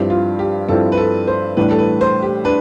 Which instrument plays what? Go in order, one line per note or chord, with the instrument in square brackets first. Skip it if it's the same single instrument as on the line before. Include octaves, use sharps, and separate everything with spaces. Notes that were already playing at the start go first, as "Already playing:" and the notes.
Already playing: [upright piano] G2 F3 C4 E4 [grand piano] G4
[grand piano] F4
G4
[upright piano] G2 F3 C4 E4 [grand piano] A4
[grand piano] B4
A4
C5
[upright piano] A2 E3 G3 D4 [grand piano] B4
[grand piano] A4
B4
C5
G4
[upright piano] D4 [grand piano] B4